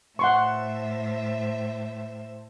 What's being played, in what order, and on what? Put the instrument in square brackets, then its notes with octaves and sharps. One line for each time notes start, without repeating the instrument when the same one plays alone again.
[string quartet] A2 C5 E5 [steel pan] F#5 C6 C#6